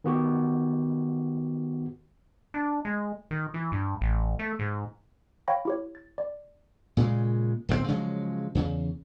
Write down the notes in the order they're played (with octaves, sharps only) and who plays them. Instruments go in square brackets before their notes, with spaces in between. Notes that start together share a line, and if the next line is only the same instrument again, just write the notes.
[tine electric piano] D#3 B3 F#4 G4
[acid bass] D4
G#3
D#3
E3
G2
A1
A3
G#2
[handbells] C#5 F5 G5 B5 C#6 A#6
E4 G4 C#5
A6
D5
[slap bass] A#2 C#3 F#3 G#3
D1 B1 A#2 C4
C#3 F3 F#3 G#3
E2 C#3